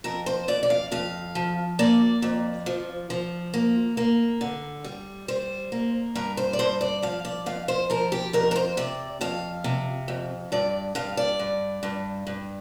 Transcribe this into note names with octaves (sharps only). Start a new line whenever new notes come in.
F2 A#4
C5
F2 D5
D5
F5
F2 F5
F3
A#3 D5
F2
F3
F3
A#3
A#3
D3
G3
G3 C5
A#3
G2 A#4
C5
D5
G2 C5
D5
F3 F5
D5
F2 F5
C5
F3 A#4
G4
F2 A#4
A#4
C5
C3 D5
F2 F5
C3
F2
G2 D5
G2 F5
D5
G2
G2
G2